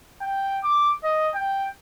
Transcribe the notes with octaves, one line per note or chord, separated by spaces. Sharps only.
G5
D6
D#5
G5